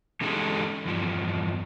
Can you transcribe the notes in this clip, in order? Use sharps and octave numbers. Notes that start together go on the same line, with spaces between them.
E3 G#3 C#4 D#4 G4 A4
E2 G2 F3